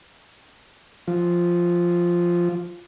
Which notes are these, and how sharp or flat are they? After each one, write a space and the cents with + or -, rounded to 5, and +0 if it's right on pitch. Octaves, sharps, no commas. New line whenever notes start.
F3 -5